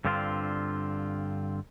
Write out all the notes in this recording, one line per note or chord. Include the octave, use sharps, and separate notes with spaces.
G2 D3 C4 F4